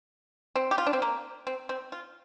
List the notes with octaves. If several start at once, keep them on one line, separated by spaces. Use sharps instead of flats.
C4
G4
F4
D4
C4
A#3
C4
C4
F4